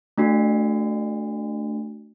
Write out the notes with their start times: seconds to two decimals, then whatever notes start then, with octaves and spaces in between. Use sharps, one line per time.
0.18 A3 D4 F#4